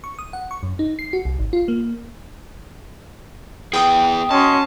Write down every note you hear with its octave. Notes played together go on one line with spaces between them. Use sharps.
C#6
D#6
F#5
C#6
F#2
D#4
C7
F#4
C2
G#1
F4
A#3
B3 E4 G#4 G5 D#6
C#4 F#4 D#5 A5 C6